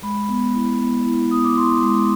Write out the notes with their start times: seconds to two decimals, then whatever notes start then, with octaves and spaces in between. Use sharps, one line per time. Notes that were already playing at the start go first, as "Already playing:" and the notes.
0.02 G#3 B5
0.29 B3
0.54 E4
0.80 B3
1.06 E4
1.31 B3 D#6
1.44 D6
1.57 E4 C6
1.82 G#3